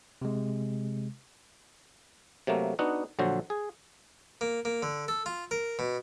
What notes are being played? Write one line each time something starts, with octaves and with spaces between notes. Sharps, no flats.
C3 G#3
C3 F#3 A3 A#3
B3 D4 D#4 F#4 F#5
A#1 D3 F#3 F#4 C5
G#4
A#3
A#3
D3
A4
F4
A#4
B2